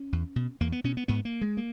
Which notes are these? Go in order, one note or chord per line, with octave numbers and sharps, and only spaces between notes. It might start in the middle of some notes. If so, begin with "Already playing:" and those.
Already playing: C#4
E2
B2
E2 A#3
B3
B2 C#4
B3
G#2 B3
A#3
G#3
A#3